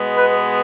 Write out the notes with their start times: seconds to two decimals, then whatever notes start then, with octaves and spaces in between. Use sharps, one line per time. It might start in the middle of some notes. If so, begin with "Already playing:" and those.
Already playing: B2 G#3 B3
0.16 B4